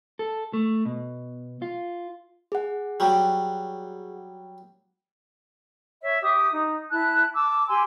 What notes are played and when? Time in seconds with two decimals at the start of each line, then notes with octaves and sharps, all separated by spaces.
0.19 A4
0.53 A3
0.85 B2
1.62 F4
2.52 G#4 F#5
3.00 F#3 G3
6.03 C#5 E5
6.21 G4 E5 D#6
6.50 D#4
6.91 E4 A5 F#6
7.35 A5 D6 E6
7.68 G4 G#5 C6 E6